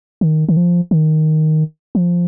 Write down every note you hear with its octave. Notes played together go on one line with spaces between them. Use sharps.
D#3
D#3
F3
D#3
F3